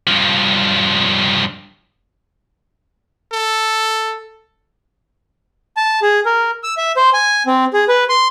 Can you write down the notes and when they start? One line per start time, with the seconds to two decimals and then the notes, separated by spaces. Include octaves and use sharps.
0.07 G2 F3
3.33 A4
5.77 A5
6.02 G#4
6.26 A#4
6.63 E6
6.77 E5
6.97 C5
7.14 G#5
7.46 C4
7.73 G#4
7.88 B4
8.09 C6